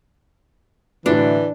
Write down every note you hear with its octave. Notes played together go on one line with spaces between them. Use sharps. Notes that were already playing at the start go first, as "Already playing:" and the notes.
A2 D3 E3 F#3 D4